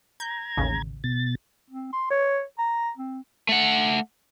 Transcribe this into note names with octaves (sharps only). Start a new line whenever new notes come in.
A#5 G6 G#6
A1 D#2 C#3
B2 A6
C4
C6
C#5
A#5
C4
A3 F#5